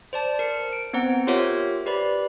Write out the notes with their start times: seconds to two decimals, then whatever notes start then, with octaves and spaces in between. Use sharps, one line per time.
0.13 C5 D5 A5
0.39 A#4 C#7
0.73 D7
0.93 B3 C4 C5 F#5 A#5
1.27 F4 G4 A#4 C5 C#5 E5
1.86 G4 B4 D5 B5